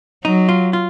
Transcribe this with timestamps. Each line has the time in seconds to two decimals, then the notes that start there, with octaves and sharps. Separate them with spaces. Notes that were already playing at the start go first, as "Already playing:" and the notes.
0.25 F#3 D#4
0.49 F4
0.73 F4